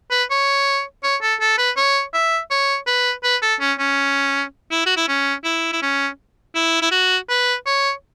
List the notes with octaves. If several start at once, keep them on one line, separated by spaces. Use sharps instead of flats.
B4
C#5
C#5
A4
A4
B4
C#5
E5
C#5
B4
B4
A4
C#4
C#4
E4
F#4
E4
C#4
E4
E4
C#4
E4
E4
F#4
B4
C#5